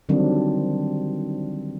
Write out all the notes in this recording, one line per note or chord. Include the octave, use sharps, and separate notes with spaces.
D3 D#3 F#3 G3 C4 D4